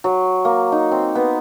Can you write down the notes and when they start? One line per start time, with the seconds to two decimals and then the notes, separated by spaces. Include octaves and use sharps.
0.04 F#3
0.45 A#3
0.72 D#4
0.91 C4
1.15 B3